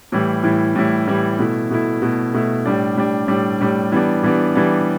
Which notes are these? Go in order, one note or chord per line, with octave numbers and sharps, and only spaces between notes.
A2 E3 G3 E4
A2 E3 G3 E4
A2 E3 G3 E4
A2 E3 G3 E4
B2 A3 E4
B2 A3 E4
B2 A3 E4
B2 A3 E4
A2 G3 D4
A2 G3 D4
A2 G3 D4
A2 G3 D4
E3 G3 B3 D4
E3 G3 B3 D4
E3 G3 B3 D4